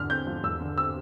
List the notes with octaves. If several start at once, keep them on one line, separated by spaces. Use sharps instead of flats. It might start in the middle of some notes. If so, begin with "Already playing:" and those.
Already playing: E2 D3 F6
C4 G6
F3
E2 E6
D3
C4 E6